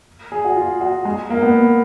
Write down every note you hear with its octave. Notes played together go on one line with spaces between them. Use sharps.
G#4
F#4
F4
F#4
G#3
A#3
B3